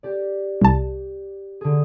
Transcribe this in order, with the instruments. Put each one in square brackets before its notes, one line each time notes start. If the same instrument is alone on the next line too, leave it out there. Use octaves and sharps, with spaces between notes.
[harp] G4 D5
[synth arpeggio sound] C2 A5
[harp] D3 G#4